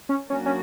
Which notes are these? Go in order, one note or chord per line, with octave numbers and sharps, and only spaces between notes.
C#4
F#3 A#3 C#4 D4 F#4
C#4